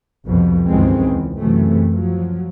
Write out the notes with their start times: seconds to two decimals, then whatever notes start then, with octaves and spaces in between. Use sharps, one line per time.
0.25 C2 F2 B2 F3
0.67 C#2 G2 D#3 E3 G#3 C4
1.08 E2
1.39 F#2 C3 E3 A3
1.89 F3 F#3